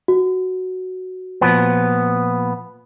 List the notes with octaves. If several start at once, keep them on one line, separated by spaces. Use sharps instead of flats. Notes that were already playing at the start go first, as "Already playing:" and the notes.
F#4
A#2 F3 B3